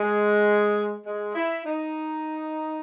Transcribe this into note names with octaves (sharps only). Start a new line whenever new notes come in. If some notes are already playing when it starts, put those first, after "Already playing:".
Already playing: G#3
G#3
E4
D#4